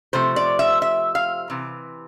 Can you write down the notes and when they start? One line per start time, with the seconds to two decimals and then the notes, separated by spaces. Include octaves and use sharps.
0.13 C3 F3 A3 C5
0.36 D5
0.59 E5
0.82 E5
1.15 F5
1.50 C3 E3